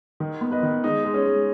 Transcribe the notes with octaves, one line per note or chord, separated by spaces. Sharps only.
D#3
B3
B4 D#5
D#3
G#3 D#4
G#3
C#4
G#3